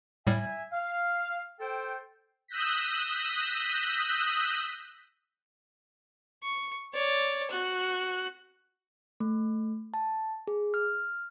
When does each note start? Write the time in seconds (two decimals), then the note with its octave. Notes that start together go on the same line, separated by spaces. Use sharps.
0.27 A2 G3 E5 G#5
0.72 F5
1.60 A4 C5 G5
2.48 D#6 E6 F#6 G6 A#6 B6
6.43 C#6
6.93 C#5 D5
7.51 F#4 F#6
9.20 A3
9.94 A5
10.47 G#4
10.74 F6